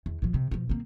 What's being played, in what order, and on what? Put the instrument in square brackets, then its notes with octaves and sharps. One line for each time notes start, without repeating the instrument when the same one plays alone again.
[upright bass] E2
A2 F3
C3
B2 F3
A#3 C4